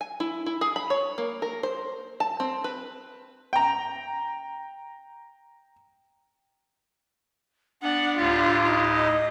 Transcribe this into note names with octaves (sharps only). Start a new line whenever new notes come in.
G#5
E4
E4
G#4
B5
C#5
A#3
A#4
C5
A5
C4
B4
G5 A#5
B3 D4 F#5
D2 A2 F4 G4
D#4
D#5